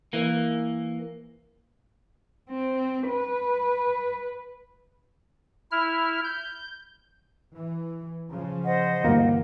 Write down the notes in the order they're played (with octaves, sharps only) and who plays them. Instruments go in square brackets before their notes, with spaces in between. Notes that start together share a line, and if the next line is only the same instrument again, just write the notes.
[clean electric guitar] E3 A#3
[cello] C4
B4
[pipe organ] E4 F6
G6
[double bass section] E3
C#3 F3
[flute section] C5 D#5 F#5
[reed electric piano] D2 G2 [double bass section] E3 [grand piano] A#3